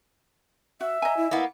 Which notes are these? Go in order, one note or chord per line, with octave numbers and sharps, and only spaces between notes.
F#4 E5
D#5 G#5 A#5
E4
A#3 B3 E4